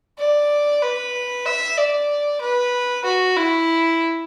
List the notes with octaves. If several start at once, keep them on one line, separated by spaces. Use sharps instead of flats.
D5
B4
E5
D5
B4
F#4
E4